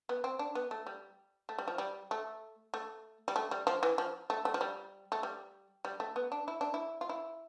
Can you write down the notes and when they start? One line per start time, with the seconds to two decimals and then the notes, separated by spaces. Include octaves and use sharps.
0.09 B3
0.24 C4
0.39 D4
0.55 B3
0.71 A3
0.86 G3
1.49 A3
1.58 G3
1.68 F3
1.78 G3
2.11 A3
2.74 A3
3.28 G3
3.36 A3
3.51 G3
3.67 F3
3.83 E3
3.98 F3
4.30 A3
4.45 A3
4.54 F3
4.61 G3
5.12 A3
5.23 G3
5.85 G3
6.00 A3
6.16 B3
6.32 D4
6.48 E4
6.61 D4
6.74 E4
7.01 F4
7.09 E4